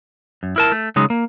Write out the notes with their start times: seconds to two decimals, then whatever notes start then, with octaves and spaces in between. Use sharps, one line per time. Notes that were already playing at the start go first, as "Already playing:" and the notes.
0.43 F#2
0.56 E4 A#4 A5
0.72 A3
0.96 C#3 F#3 G#3 D#4
1.10 A#3